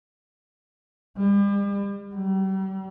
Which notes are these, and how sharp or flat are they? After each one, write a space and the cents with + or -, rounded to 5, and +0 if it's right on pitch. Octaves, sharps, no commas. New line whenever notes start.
G3 +40
G3 -40